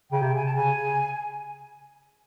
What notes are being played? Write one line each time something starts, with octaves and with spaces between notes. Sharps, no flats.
C#3 G5
C3
G#5
A5
C#3 G#5